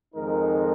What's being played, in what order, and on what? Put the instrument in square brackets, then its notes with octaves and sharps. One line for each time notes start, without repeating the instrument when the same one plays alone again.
[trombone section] F2 D#3 G#3 D#4 A#4